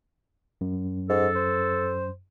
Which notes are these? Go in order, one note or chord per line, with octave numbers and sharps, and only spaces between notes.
F#2
G#2 A4
C5